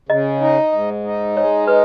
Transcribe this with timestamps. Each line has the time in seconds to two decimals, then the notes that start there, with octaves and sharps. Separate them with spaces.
0.09 C#3 D#5
0.41 D#4
0.72 G#2
1.04 D#4
1.37 G#3 C#5
1.67 D#4 B4